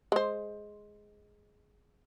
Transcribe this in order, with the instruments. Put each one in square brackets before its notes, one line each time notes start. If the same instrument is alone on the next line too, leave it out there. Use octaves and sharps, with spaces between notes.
[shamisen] G#3 C5